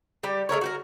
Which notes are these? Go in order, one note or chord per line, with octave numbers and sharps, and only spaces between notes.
G3 G4
G#3 A3 A#4 C#5
F#4 G4 A#4